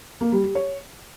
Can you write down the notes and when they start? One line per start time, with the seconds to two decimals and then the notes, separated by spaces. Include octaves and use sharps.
0.21 A#3
0.32 G3
0.44 G4
0.55 C#5